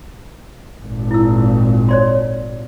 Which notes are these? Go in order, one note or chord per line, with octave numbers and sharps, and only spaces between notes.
G#1 A#2
E4 E6
C#5 D5 C6